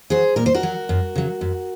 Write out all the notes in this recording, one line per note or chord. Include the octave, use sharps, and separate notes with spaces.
F#3 G#4 C5
A#2 A#4
C5
F#4 A#4
F#3
F#2
C#3 F#3
F#2